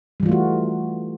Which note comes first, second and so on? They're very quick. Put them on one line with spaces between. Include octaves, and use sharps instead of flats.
G3 E3 F4 A3 F#4